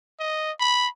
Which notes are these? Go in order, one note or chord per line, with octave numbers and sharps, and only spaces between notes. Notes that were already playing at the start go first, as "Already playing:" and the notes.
D#5
B5